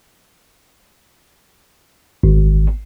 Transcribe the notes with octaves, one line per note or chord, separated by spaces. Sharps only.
G#1